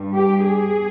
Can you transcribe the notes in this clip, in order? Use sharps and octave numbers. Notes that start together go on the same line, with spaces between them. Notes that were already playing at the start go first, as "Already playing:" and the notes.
Already playing: G2 G3
G4
G#4